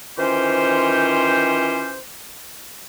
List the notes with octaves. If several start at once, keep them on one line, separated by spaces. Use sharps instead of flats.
D#3 E3 C#4 F4 G4 C5